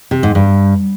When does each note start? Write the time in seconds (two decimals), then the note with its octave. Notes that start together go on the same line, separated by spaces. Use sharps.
0.11 C3
0.23 G#2
0.35 G2